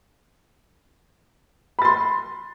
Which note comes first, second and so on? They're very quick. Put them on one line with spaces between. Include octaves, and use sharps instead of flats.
B5 A6 C6